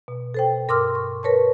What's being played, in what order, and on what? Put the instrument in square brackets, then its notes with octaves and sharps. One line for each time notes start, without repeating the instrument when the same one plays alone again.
[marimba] B2
A4 C5 G5
G2 A#4 C6 D6 E6 F6
C#6
A#4 B4 C#5 A5 C#6